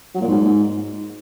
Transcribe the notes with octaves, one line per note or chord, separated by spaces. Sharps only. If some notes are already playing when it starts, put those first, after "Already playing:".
F#3
A#2
G#2